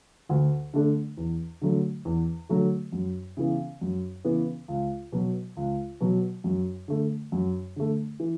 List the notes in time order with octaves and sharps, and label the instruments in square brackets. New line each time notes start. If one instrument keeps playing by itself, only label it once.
[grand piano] D2
D3 A3 D4 A4
E2
D3 F#3 A3
E2
D3 F#3 A3
F#2
C#3 E3 B3
F#2
C#3 E3 B3
C#2
B2 F#3
C#2
B2 F#3
F#2
D3 A3
F#2
D3 A3
E3